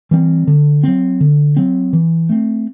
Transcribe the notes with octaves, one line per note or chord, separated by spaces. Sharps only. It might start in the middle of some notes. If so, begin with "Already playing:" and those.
E3 G3 C4
D3
F#3 C4
D3
F#3 C4
E3
A3 C4